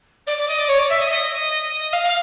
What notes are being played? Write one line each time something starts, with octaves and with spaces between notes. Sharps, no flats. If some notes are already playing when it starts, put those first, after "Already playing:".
D5
D5
D#5
D5
C#5
D5
E5
D#5
D#5
F5
F5